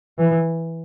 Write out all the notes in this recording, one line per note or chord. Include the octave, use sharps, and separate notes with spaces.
E3